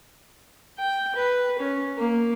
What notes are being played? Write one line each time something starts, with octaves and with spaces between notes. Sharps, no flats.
G5
B4
C#4
A#3